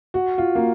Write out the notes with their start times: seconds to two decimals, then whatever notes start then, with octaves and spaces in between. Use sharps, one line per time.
0.14 F#4
0.38 F4
0.55 A#3